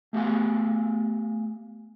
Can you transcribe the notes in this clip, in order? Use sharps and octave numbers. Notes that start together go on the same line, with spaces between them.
A3 B3 G4 F5 G#5